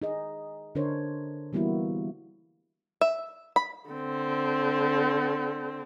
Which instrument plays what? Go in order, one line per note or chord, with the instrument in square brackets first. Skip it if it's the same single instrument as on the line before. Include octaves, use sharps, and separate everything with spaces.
[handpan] D#4 G#4 D#5
D3 D4 A#4 C5 C#5
E3 G3 A#3 B3 E4 F#4
[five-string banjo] E5
B5
[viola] D3 C4